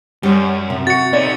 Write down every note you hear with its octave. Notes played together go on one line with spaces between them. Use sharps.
F#2 G3 C#5
C3
F#4 A6 C#7
B3 D#4 C#5 D5